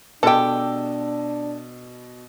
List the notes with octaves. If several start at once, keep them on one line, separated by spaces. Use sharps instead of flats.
B2 G#3 D4 G4 A4 G5 E6